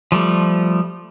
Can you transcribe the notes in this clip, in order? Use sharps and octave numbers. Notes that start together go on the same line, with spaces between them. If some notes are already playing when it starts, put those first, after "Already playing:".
F3 G3 A3